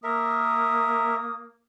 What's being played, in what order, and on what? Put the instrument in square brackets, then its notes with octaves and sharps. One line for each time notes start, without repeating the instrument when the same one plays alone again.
[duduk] A#3 [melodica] A#4 E5 [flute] D#6